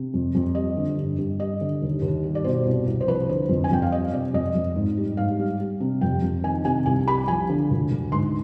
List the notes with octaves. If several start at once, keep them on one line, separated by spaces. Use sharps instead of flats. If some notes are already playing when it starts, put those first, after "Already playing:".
Already playing: C3
F2
F2
G3 D#5
D3
G2
G2
G3 D#5
D3
D#2
D#2
G3
D5
B2 C5
C2
C2
C5
F3 B4
D3 C5
F2
G#5
F2 G5
F5
G3 D#5
C3 D5
F2 D#5
F2
G#2
G3
G#2 F5
G3
G3
C3
F2 G5
F2
D#3 G#5
C3 G#5
C2 G#5
G3 B5
F3 G#5
D3
D2
D2
G#2 C6